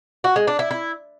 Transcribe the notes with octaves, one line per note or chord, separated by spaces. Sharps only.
F#4
G#3
D4
E4
E4